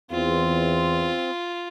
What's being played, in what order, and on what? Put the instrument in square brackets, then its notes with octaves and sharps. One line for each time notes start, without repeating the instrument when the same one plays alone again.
[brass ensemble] E2 [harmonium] C4 [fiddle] F4